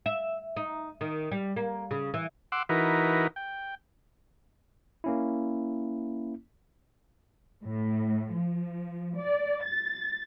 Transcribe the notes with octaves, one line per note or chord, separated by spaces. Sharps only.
E5
D#4
D#3
G3
A#3
C#3
E3
F#5 C6 D6 E6
E3 D#4 F#4 A#4 B4
G5
A#3 C#4 E4
A2
F3
D5
A6